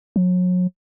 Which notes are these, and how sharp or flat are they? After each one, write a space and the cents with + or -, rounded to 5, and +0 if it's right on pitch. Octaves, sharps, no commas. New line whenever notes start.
F#3 -35